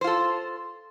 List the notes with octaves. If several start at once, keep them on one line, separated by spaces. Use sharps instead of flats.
F4 A4 C5